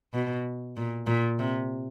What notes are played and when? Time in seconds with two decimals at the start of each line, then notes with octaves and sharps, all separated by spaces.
0.14 B2
0.77 A#2
1.07 A#2
1.39 C3